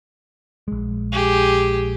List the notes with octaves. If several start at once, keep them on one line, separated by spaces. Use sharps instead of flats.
A#1 G#3
G4 G#4